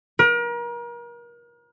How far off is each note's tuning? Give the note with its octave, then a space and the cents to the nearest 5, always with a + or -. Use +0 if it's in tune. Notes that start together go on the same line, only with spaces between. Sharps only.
A#4 +35